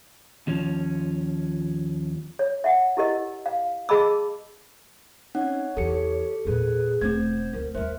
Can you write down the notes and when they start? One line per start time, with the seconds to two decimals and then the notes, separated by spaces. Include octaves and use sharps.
0.47 D#2 F3 C#4
2.39 C#5
2.64 E5 F#5
2.97 E4 G4 A#4 D#5
3.46 F5
3.89 G#4 D#5 A5 B5 D6 E6
5.35 C4 C#4 D#4 C#5 F#5
5.77 E2 E3 G4 A4 C#7
6.45 E2 A#2 G#4 B4
7.01 E1 A3 C4 C5 G#6
7.53 D2 A#4
7.75 D#2 G3 A#4 C5 E5